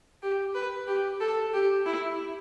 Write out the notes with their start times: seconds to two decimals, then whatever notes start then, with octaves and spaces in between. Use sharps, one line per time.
0.22 G4
0.54 B4
0.87 G4
1.20 A4
1.54 G4
1.86 E4